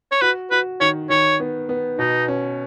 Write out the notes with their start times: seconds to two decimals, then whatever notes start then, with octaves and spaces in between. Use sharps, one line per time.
0.12 C#5
0.22 F#4 B4
0.51 F#4 B4
0.81 D#3 C#5
1.10 D#3 C#5
1.40 B3
1.69 B3
1.99 B2 D#4
2.28 C#4